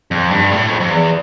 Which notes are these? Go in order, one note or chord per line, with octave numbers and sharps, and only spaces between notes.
F2
G2
A2
F2
F2
E2